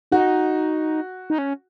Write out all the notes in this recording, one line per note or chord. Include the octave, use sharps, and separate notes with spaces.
D#4 F#4
D#4
C#4